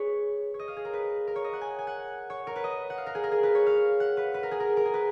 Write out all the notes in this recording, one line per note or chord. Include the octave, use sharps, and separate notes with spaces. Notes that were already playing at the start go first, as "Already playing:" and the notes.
Already playing: G#4 B4 C#5
C#5
D#5
F5
G#4
A#4
B4
A#4
C#5
D#5
F#5
G#5
G#5
F#5
C#5
A#4
B4
D#5
F#5
F5
A#4
G#4
A#4
G#4
B4
C#5
F5
F#5
B4
B4
A#4
G#4
A#4
A#4
G#4
B4